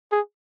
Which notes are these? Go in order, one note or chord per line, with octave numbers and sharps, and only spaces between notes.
G#4